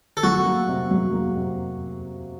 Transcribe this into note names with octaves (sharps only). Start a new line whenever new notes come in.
A4
F#3 F#4
A#3
C3
F#3
A#3
C3